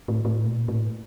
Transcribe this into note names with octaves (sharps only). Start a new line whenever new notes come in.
A2
A2
A#2
A2